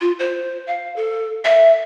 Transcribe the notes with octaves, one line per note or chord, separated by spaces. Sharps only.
F4
C5
F5
A4
E5